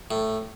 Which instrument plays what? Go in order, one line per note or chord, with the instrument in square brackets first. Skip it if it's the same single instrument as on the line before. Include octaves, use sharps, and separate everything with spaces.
[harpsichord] A2